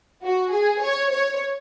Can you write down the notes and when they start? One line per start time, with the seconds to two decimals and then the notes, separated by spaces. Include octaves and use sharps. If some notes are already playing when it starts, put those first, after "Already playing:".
0.23 F#4
0.53 G#4
0.83 C#5
1.12 C#5